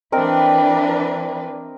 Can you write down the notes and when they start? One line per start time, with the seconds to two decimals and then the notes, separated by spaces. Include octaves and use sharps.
0.12 E3 C4 D4 A#4 B4 D#5